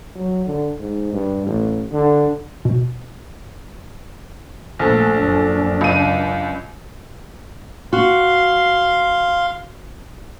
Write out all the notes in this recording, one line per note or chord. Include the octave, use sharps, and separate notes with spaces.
F#3
D3
G#2
G2
A1
D3
B2
A#1 A#2 A3 A4
F#2 D4
C#2 D#7
F#4 F5 C6